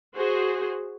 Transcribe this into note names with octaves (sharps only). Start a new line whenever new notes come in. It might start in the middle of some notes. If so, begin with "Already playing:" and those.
F#4 G#4 C5